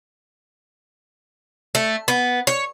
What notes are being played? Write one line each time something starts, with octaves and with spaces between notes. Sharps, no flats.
A3
B3
C#5